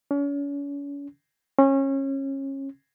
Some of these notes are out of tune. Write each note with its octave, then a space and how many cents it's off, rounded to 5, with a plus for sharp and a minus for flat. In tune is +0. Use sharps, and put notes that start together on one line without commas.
C#4 +40
C#4 -25